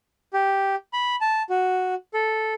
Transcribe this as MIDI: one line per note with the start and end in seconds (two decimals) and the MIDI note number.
0.34 0.75 67
0.93 1.16 83
1.21 1.42 81
1.50 1.94 66
2.14 2.54 69